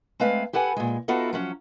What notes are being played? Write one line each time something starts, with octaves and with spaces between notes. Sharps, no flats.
G#3 A3 C4 B4 F5
G4 A4 B4 F#5 G#5
A#2 G#3
B3 D#4 F4 F#4 A4 E5
F3 F#3 C#4